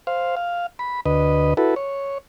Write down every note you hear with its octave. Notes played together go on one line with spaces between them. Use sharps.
C5 F5
F5
B5
D2 B4 D#5
E4 F#4 A4 B4
C#5